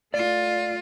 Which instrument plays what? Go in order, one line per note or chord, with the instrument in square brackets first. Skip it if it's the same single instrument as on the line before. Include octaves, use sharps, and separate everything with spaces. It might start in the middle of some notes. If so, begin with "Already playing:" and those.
[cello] A3 F4 [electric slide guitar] D5